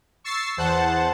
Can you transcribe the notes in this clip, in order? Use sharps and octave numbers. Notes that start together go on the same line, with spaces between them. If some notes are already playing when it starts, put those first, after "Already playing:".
C#6 E6 A6 C7
E2 C5 F#5 A5